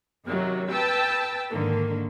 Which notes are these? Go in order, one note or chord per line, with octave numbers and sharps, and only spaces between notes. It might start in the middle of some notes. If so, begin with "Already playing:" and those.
F#2 C3 D#3 F#3
B4 G5 A5 E6
G#2 D3 D#3 A#3